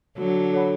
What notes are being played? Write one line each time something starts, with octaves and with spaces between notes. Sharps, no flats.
D3 F#3 F#4
A4 C#5 F#5 B5